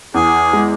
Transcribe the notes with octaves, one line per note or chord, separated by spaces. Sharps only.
E2 G#4
G#3